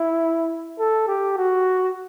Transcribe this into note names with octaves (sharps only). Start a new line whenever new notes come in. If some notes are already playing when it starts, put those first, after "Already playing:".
Already playing: E4
A4
G4
F#4